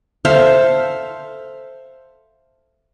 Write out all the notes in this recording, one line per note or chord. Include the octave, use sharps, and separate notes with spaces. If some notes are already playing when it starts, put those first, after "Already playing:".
A4 C5 E5 F5